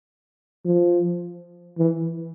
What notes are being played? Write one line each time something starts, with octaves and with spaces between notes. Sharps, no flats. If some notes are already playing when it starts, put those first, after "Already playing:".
F3
E3